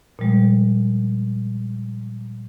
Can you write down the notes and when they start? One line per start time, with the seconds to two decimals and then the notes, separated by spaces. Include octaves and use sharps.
0.19 A#2 F3 G3 G#3